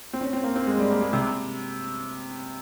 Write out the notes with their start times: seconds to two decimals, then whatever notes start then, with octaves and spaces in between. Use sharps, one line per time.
0.13 C4
0.21 C#4
0.33 C4
0.44 A#3
0.56 C4
0.67 G#3
0.79 G3
0.90 A#3
1.02 G#3
1.13 C3